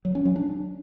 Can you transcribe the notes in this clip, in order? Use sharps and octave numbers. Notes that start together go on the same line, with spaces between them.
F#3
C#4
F#3
D4